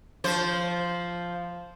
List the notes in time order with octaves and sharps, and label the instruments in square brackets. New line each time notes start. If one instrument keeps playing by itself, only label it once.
[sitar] F3 C5